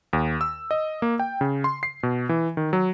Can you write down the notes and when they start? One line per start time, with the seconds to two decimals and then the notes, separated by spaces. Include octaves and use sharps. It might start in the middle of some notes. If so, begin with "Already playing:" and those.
0.13 D#2
0.41 E6
0.71 D#5
1.02 A#3
1.19 G5
1.41 C#3
1.64 C6
1.83 C7
2.03 B2
2.29 E3
2.57 D#3
2.73 F#3